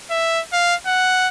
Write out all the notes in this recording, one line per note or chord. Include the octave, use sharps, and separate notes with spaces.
E5
F5
F#5